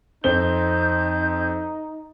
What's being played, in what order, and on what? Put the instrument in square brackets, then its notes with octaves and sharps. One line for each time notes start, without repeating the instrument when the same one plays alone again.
[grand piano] F2 C4 G7 [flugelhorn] D#4 [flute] G6